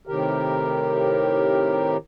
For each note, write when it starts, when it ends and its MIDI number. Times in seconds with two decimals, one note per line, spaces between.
0.07 1.97 45
0.07 1.97 48
0.07 1.97 51
0.07 1.97 67
0.07 1.97 70